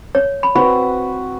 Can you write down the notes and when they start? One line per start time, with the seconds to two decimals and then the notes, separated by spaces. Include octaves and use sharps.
0.15 C#5
0.43 B5
0.55 C4 F#4 B4 B5